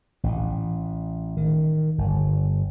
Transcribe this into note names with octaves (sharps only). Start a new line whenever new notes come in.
A1
D#3
G1